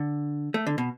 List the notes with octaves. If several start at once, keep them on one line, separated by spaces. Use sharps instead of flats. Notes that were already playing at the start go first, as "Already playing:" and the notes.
Already playing: D3
A3
D3
B2